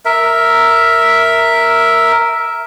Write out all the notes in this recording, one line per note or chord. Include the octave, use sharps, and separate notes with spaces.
A#4 E5